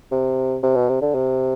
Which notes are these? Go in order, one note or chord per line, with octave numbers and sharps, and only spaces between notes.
C3
C3
B2
C3
D3
C3